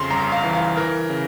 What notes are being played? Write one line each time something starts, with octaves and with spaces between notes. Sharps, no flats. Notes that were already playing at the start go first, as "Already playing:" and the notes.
Already playing: F2 C#3 C6
G1 A#5
F5
E3
F5
E3 A#4
C#3